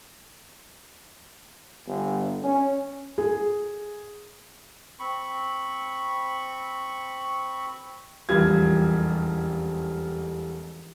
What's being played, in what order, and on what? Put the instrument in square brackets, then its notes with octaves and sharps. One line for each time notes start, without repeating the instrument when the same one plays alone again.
[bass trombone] G1
C#4
[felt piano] G#4
[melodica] C4 B5 C#6
[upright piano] E1 A1 F2 G3 F4 G#6